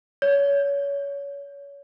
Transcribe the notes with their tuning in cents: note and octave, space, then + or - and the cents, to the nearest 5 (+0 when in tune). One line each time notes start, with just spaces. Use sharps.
C#5 +25